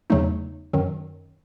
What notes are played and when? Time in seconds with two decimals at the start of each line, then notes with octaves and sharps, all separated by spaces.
0.10 E2 C#3 F#3 A3 D#4
0.73 F#2 D#3 F#3